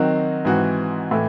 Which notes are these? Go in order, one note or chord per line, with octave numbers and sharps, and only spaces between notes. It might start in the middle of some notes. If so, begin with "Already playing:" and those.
Already playing: D#3 F#3 C4 D#4 F#4
G#2 E3 C4 F#4
A2 E3 A3